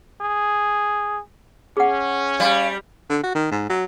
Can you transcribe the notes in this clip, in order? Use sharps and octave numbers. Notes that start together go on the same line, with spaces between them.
G#4
C#4 G#4 F#5
G3 F5
D3
F#4
D#3
G#2
F#3